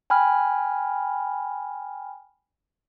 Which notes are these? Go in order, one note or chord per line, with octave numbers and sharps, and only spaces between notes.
G5 G#5 B5 F6